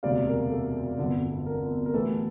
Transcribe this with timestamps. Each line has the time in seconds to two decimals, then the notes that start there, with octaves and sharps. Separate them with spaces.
0.03 E1 D2 C3 D5 F5
0.27 A#4
0.50 A4
0.99 G1 F2 D3
1.46 A#4
1.86 A#4
1.94 A1 A2 E3 A4